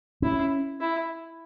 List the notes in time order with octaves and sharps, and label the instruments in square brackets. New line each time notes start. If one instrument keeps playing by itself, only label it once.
[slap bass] C#4 [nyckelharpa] E4
[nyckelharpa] E4